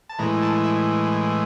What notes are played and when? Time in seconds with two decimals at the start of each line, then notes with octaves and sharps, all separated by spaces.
0.09 A5
0.19 A2 E3 G#3 A#5
0.42 A5
0.64 E5